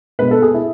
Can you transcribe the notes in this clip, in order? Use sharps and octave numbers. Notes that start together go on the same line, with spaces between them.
B2 G#3 B4
A4
G#4
E4